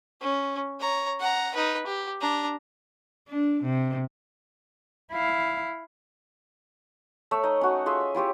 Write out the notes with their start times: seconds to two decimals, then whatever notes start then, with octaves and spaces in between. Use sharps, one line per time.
0.22 C#4
0.80 C#5 A#5
1.20 F#5 A#5
1.54 D#4 B4
1.86 G4
2.21 D4 A#5
3.28 D4
3.63 C3
5.12 E4 F5
7.31 A3 C#5 E5
7.43 D#4 D#5
7.61 C#4 F#4
7.86 F4 G#4 D#5 E5
8.00 E5
8.15 E4 F4 G4 C#5